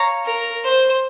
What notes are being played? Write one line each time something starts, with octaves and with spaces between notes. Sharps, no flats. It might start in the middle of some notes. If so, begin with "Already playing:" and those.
Already playing: C#5 F5 A#5
A#4
C5